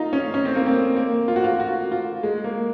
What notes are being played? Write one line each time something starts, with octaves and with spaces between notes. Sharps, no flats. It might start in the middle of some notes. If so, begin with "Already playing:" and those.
Already playing: D#4 F4
C#4
C#4
C4
A#3
C4
A#3
F4
F#4
F4
F#4
F4
G#3
A#3